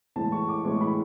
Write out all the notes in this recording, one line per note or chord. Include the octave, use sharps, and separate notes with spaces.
A2 E3 G#3 A5
C#6
D6
A2 E3 G#3 C#6
B5